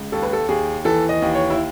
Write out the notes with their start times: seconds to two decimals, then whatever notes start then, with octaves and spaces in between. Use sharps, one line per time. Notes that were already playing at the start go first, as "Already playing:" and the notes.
Already playing: C#2
0.12 D#2 A4
0.23 B4
0.33 A4
0.48 D#2 G#4
0.85 E3 A4
1.09 D#5
1.22 D#2
1.35 C#5
1.50 E4